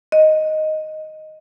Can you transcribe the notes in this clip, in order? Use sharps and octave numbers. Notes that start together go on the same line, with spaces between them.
D#5